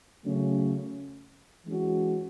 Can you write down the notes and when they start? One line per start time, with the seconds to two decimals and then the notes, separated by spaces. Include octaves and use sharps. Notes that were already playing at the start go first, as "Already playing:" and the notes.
0.24 C#3 F#3 A3 C#4
1.66 E3 G#3 C#4 F#4